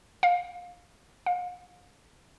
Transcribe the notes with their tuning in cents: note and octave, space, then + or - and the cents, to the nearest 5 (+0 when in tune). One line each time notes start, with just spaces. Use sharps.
F5 +25
F5 +40